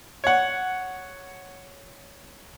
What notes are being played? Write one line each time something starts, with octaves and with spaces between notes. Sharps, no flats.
C#5 F#5